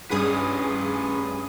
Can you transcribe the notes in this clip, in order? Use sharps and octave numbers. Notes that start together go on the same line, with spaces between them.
G2 C#4 G#4 B4 D#6